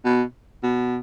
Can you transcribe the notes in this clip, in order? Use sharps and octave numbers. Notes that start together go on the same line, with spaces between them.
B2
B2